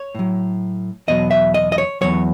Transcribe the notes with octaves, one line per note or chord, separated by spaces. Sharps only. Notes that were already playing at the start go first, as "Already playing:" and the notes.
Already playing: C#5
A2 F#3
E2 B2 F#3 D#5
E5
D#5
D#5
C#5
E2 B2 F#3 C#5